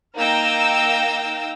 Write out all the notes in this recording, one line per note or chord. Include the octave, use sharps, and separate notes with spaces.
A#3 D#4 F5 G5 E6 A#6